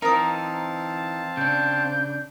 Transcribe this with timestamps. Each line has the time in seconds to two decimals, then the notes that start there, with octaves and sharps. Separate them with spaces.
0.02 E3 C4 D#4 A#4 F5 A5 D#6
1.37 C#3 D4 G6